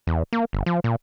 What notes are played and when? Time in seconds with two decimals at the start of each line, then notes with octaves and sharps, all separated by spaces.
0.07 E2
0.33 A#3
0.53 G1
0.66 F3
0.84 A#2